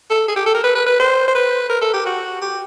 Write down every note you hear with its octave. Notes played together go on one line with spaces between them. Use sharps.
A4
G#4
G4
A4
A#4
B4
B4
B4
C5
C5
B4
A#4
A4
G4
F#4
G4